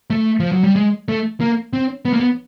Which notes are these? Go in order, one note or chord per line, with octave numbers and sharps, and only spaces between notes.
A3
F3
F#3
G3
G#3
A3
A#3
C4
B3
A#3
B3